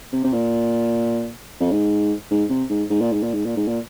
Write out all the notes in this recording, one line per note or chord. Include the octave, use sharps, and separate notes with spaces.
C3
C3
A#2
F2
G#2
G#2
C3
G#2
G#2
A#2
G#2
A#2
G#2
A#2
G#2
A#2